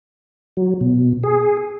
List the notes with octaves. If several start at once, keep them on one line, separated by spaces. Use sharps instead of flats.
F#3
B2
G#4